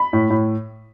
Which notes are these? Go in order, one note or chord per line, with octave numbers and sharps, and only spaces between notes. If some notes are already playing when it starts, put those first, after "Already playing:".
Already playing: B5
A2
A2